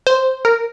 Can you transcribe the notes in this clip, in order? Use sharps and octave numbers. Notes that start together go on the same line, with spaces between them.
C5
A#4